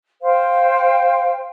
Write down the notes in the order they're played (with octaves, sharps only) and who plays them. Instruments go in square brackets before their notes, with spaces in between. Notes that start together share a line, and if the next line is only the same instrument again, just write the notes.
[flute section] C5 F5 G5